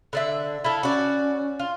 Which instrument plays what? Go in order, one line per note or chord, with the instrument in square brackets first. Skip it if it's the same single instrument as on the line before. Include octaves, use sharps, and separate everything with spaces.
[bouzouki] D3 D4 E5
E4 F4 A4
[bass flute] C#4 [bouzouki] F#4 D5
[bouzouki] F4